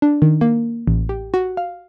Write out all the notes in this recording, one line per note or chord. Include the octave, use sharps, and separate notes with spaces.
D4
D#3
A#3
A1
G4
F#4
F5